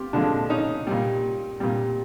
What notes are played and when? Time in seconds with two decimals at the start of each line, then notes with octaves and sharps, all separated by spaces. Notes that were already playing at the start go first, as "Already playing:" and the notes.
Already playing: F4 G4
0.13 D3 F3 G#3 D4
0.50 C#4 D#4
0.87 A#2 G3
1.60 A#2 G3